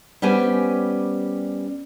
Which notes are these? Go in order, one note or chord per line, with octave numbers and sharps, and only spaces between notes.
G3 B3 C#4 G4 C5 G#5